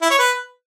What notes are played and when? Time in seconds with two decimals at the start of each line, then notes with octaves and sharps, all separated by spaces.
0.02 E4
0.10 C#5
0.19 B4